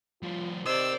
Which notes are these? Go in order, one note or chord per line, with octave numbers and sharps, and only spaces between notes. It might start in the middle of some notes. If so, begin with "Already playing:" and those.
F3 G3 F4
C3 A#4 C5 D5 D#5 E6